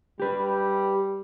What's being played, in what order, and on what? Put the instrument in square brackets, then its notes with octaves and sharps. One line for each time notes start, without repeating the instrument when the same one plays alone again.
[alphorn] G3 [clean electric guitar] G4 B4